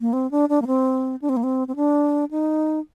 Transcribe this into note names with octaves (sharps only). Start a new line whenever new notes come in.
A#3
C4
D4
D4
A#3
C4
D4
C4
A#3
C4
C4
D4
D#4